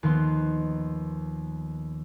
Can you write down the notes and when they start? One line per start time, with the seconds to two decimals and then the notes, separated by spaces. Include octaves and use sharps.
0.03 D#2 D#3 F3 B3 C6